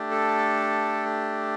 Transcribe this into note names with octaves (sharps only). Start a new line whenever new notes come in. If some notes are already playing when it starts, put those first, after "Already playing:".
Already playing: A3 D4 G4
A4